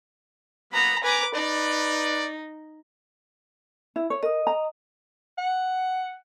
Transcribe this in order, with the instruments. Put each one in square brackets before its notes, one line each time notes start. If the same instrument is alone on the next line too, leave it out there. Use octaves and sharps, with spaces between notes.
[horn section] F#3 A#3 B3 [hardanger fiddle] A#5 B5
[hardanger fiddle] B4 D6 [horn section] G#5 A#5
[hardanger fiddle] D#4 [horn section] B4 D5
[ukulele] E4
C#5
[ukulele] A#4 [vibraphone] D#5 D#6
[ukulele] A#5
[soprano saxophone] F#5